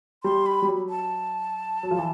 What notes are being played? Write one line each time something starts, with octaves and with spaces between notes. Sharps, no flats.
G3 C6
B5
G3
F#3
A5
F#3
F3
E3